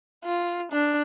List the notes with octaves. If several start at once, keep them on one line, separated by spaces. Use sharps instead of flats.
F4
D4